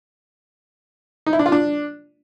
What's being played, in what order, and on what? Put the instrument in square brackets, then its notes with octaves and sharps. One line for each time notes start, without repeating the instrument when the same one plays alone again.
[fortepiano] D#4
E4
D4
F4
D4